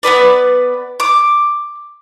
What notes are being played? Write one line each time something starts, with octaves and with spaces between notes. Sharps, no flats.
B3 C4 B4 D5
D6